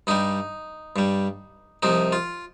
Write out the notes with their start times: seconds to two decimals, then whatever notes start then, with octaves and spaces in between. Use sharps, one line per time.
0.07 G2 G3 D#4
0.96 G2 G3
1.83 C2 C3 F3 D#4
2.12 F4